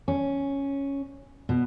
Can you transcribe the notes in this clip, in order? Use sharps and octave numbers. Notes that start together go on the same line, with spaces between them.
C#4
B2